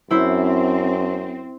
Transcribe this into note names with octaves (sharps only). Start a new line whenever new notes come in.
F#2 C4 E4 C5